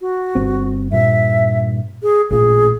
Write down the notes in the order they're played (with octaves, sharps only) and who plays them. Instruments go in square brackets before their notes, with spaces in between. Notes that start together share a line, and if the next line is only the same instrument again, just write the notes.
[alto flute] F#4
[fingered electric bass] G1 C4
[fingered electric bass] G2 A#2 [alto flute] E5
[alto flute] G#4
[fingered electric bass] A1 A#2 [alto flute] G#4